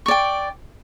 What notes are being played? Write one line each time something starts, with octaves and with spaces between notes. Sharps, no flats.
D5 G5 C#6